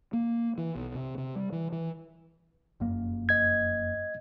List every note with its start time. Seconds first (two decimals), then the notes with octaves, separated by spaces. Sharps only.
0.13 A#3
0.58 E3
0.75 B1
0.95 C3
1.18 C3
1.35 G3
1.52 E3
1.72 E3
2.80 F1 F#2 A#3
3.29 D#5 G#6